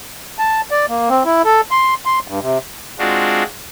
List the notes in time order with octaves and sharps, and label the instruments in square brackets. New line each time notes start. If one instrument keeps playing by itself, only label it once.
[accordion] A5
D5
A#3
C4
E4
A4
C6
C6
G2
C3
[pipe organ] G#3 C4 D4 F4 F#4